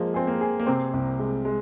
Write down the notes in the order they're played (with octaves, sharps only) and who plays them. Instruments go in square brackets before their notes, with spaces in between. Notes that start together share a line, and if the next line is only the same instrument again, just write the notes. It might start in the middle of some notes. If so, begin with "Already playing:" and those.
Already playing: [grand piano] F3 [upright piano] G#3 A#3
[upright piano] C4 [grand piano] G#4
[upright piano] A#3
[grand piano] G#4
[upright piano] A#3
[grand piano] C3 [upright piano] C4
[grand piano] C2
G#3
G#3